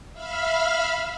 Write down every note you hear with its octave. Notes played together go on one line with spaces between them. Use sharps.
E5 F5 B5 F6